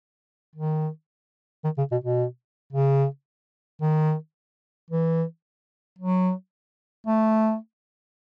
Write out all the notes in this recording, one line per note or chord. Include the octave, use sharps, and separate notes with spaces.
D#3
D#3
C#3
B2
B2
C#3
D#3
E3
F#3
A3